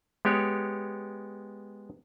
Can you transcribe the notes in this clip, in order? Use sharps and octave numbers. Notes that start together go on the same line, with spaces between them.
G#3 B3 G4 C#5